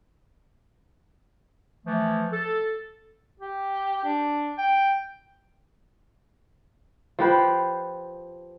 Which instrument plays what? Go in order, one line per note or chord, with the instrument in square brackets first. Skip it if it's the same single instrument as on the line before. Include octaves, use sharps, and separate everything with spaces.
[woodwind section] E3 F3 A3
A4
[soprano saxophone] G4
D4
G5
[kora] F3 G4 B4 C5